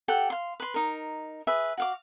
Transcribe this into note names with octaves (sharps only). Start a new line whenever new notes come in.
G4 A4 F#5 G5
F5 C6
B4 C6
D#4 A#4
G#4 B4 E5
F#4 F5 D6